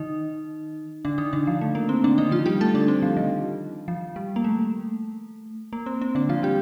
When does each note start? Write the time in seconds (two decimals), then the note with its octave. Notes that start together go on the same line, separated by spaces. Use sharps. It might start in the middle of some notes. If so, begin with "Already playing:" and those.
Already playing: D#3 D#4
1.05 D3 D4
1.18 D#3 D#4
1.33 D3 D4
1.47 F3
1.61 A3
1.75 A#3
1.89 C4
2.04 D3 D4
2.18 D#3 D#4
2.31 F3 F4
2.46 G3 G4
2.61 A3 A4
2.74 D3 D4
2.88 C4
3.03 F3
3.17 D#3
3.88 F3
4.16 G3
4.36 A#3
4.44 A3
5.73 A#3
5.86 C4
6.01 C4
6.15 D3 D4
6.29 F3 F4
6.43 G3 G4